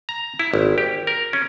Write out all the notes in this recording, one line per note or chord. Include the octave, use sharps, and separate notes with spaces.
A#5
E4
G#1
G4
A#4
C#4